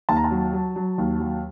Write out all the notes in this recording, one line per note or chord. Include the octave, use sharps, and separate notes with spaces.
D#2 A5
A#5
A5
F#3
F#3
F#3
D#2
F#3